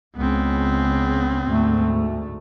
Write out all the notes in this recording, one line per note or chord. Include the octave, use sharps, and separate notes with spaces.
C#2 C#3 B3 C4
D2 G#2 A3